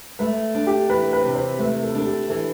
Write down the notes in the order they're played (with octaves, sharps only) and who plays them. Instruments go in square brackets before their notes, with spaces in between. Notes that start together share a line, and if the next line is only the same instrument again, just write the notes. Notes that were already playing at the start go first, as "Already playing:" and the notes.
[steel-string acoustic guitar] A3 [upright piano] B4
[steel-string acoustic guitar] D4
[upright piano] G4
[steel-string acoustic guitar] E3 [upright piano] B4
[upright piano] B4
[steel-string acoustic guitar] C3
[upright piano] C5
[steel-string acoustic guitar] A3 [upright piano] B4
[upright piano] A4
[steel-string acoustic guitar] D4 [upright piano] A4
[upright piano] G4
[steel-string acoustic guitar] E3 [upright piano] A4